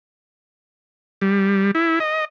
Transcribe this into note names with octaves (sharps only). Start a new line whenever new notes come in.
G3
E4
D#5